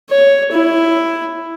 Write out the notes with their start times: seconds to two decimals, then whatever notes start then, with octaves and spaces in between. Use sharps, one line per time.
0.10 C#5
0.52 E4